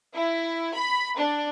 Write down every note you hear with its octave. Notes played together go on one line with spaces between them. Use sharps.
E4
B5
D4